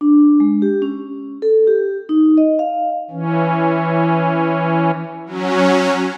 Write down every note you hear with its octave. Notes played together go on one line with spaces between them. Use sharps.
D4
G#3
G4
C#4
A4
G4
D#4
D#5
F5
E3 C#4
F#3 C#4